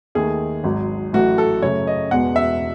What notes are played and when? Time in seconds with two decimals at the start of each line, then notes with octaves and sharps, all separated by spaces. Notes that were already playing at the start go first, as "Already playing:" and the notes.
0.15 D#2 D#3 A3 G#4
0.64 G#1 G#2 F#3
1.13 A1 A2 F#3 A3 F#4
1.38 A4
1.62 F#2 C#3 F#3 A3 C#5
1.87 D#5
2.11 E1 E2 B2 G#3 F#5
2.36 E5